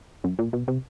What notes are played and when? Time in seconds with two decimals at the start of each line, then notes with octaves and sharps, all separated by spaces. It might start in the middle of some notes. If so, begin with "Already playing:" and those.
0.24 F#2
0.39 A#2
0.53 B2
0.68 C3